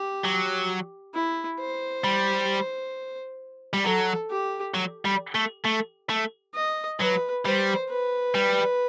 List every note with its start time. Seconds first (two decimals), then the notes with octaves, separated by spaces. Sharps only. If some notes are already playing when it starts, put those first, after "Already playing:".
Already playing: G4
0.24 F#3
1.14 E4
1.60 C5
2.04 G3
3.73 G3
3.84 F#3 A4
4.30 G4
4.74 F#3
5.05 G3
5.35 A3
5.65 A3
6.10 A3
6.54 D#5
6.99 F#3 B4
7.45 G3 C5
7.90 B4
8.35 G3